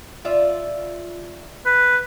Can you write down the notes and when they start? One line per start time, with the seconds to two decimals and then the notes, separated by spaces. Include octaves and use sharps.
0.25 F4 D5 E5
1.66 B4